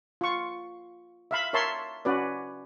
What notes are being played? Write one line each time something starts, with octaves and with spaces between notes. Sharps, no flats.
F4 C#6
E5 F5 B5
A#4 C#5 E5 A5 C6
C#4 F#4 B4 D5